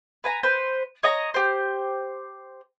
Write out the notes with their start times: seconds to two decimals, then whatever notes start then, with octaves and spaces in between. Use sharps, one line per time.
0.24 B4 G#5 A#5
0.43 B4 C5
1.03 C#5 D#5 A#5
1.34 G4 C5